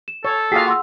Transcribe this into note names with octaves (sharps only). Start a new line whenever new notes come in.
E7
A4 C#5
A#3 F4 F#4 G#4 F5 G5 B6 C7
F#5 C6 E6